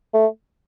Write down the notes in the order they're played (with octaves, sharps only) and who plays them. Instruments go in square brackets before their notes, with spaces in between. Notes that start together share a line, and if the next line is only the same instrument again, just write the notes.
[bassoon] A3